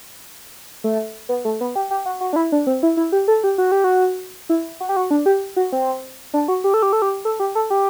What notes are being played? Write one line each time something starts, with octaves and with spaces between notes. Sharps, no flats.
A3
B3
A3
B3
G4
G4
F#4
F#4
D4
E4
D4
C4
E4
E4
G4
A4
G4
F#4
G4
F#4
E4
F#4
G4
F#4
D4
G4
F#4
C4
D4
F#4
G4
A4
G4
A4
G4
A4
G4
A4
G4